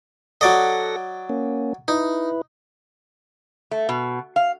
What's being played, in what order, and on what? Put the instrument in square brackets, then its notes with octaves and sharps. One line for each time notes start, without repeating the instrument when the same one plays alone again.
[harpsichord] F#3 D5 D#5 [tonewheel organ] A4 F#5 A#6
[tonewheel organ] A#3 C#4
[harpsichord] D#4 [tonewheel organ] E4 B4
[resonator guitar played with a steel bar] A3
B2
F5